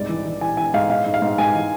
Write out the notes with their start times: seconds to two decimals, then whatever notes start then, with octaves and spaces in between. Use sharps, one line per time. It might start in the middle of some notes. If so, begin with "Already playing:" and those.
Already playing: C2 G#2 D5
0.09 E3
0.25 E3
0.41 E3 G#5
0.57 E3 G#5
0.74 G#2 F5
0.90 G#2 F5
1.06 G#2
1.14 F5
1.22 G#2
1.38 G#2 G#5
1.54 E3